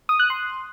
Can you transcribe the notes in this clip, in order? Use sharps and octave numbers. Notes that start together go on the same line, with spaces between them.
D#6
F#6
C6